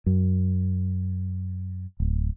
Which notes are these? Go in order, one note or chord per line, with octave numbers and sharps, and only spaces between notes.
F#2
D1